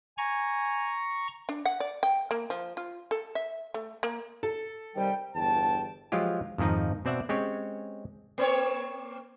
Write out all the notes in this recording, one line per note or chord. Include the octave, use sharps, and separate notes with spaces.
G#5 A#5 C#6
D4
F#5
D5
G5
A#3
F3
F4
A4
E5
A3
A#3
A4
C3 D#3 G3 G5
G1 E2 G5 A5
F3 F#3 G#3 F4 G4
F2 G#2 D#3 F3 D#4
B2 C4 D5 E5 F#5
G#3 C4 C#4 G4 C#5
A#3 C4 C#5